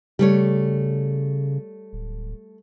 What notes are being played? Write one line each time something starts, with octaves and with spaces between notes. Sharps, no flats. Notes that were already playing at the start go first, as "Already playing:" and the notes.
C#3 G3 A3 C#5
D1